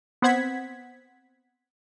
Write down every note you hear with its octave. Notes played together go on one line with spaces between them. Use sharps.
B3 C4 C5 F#5 G#6 B6